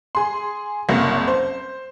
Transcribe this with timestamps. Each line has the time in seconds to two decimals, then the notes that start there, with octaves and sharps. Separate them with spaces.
0.15 G#4 C6
0.89 F#1 C2 F#3 A#3
1.28 C5